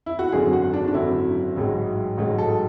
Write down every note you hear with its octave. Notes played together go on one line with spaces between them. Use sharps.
E4
F#4
G#1 F#2 D3 F#3 G#4
F#4
D4
D4
G#1 F#2 D3 F#3 E4
A1 G#2 F#3
A1 G#2 F#3
A4